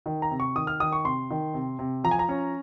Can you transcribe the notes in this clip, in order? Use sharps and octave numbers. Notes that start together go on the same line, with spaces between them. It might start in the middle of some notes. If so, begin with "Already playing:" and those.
D#3
A#5
C3
C#6
D#3 D#6
F6
D#3 D#6
C#6
C3 C6
D#3
C3
C3
F3 A#5
G#5
A#5
C#4